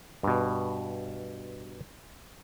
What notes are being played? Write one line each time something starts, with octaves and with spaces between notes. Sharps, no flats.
G2 B2